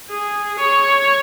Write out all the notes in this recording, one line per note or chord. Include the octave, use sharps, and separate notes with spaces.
G#4
C#5